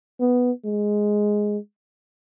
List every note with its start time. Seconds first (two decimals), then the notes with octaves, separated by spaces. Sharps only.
0.21 B3
0.65 G#3